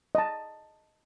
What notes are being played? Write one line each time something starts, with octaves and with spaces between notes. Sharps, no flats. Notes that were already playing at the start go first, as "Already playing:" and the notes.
D#5 A5